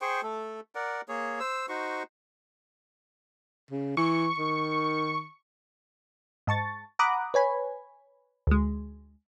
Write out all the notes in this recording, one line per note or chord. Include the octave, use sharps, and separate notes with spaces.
G#4 C5 G5 C#6
A3 A4
A#4 D5 F#5
A#3 G#4 C#5
C5 E6
D#4 F#4 C5 C#6
C#3
E3 C#6
D#3
G#2 A5 C#6 A6
F#5 A#5 B5 D6 D#6 F#6
B4 C#5 G#5 B5
D2 G#3